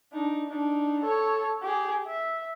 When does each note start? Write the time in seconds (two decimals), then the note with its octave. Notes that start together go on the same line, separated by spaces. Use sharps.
0.13 D4 D#4
0.49 D4 D#4
1.03 A4 C#5
1.62 G4 G#4
2.07 E5